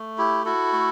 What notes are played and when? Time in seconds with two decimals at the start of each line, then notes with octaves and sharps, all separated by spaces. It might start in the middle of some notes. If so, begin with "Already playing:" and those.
Already playing: A3
0.18 E4 G4
0.45 E4 F#4 A4
0.73 A3